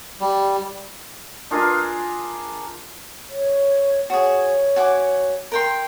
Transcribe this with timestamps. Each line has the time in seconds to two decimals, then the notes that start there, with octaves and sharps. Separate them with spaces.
0.20 G3
1.51 D4 F4 G#4 A#4
3.29 C#5
4.10 F#4 G#4 C#5
4.76 F#4 G#5 D6
5.52 A#4 G5 C6